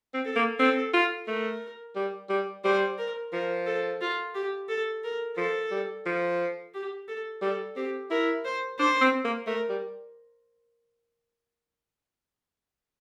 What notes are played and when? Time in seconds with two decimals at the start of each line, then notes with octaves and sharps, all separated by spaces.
0.14 C4
0.25 A4
0.36 A#3
0.59 C4 A4
0.94 F4
1.28 A3 A#4
1.96 G3
2.30 G3
2.64 G3 C5
2.99 A#4
3.33 F3 A#4
3.66 A4
4.01 F4
4.35 G4
4.69 A4
5.04 A#4
5.37 F3 A4
5.71 G3
6.06 F3
6.74 G4
7.08 A4
7.42 G3 A4
7.76 C4 G4
8.11 E4 A#4
8.45 C5
8.79 D4 C5
9.01 C4
9.25 A#3
9.47 A3 A#4
9.70 G3